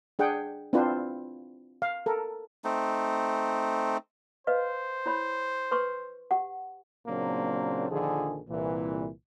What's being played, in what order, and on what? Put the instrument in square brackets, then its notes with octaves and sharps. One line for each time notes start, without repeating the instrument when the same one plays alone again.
[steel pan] D4 G#4 F#5 G5
C4 D4 E4 F4 B4 C5
F5
A4 A#4
[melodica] A3 C4 D#4
[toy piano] B4 D#5 F5 [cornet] C5
[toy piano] E4 C#5 B5
B4 C6 C#6
G4 F#5
[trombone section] A#2 C#3 F#3 A#3 C4 D4
A#1 D3 D#3 F3 G#4
C2 A#2 E3